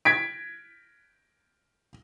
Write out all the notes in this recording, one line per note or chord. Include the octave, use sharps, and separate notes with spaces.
G#6 B6 D7